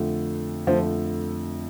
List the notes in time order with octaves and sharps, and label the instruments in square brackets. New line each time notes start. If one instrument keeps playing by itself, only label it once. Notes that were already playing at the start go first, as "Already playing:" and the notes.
Already playing: [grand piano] F2 D3 A3
[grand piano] F2 D3 A3 [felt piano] F3